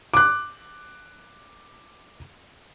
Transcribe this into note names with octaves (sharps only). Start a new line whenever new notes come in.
D6 F#6